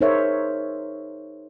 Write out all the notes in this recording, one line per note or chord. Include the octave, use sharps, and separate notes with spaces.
D#4 G#4 A#4 C5 C#5 E5